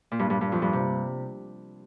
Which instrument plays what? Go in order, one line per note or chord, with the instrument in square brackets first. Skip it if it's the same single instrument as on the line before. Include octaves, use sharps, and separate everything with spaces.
[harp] A#2
G2
G2
G2
F2
G2
C3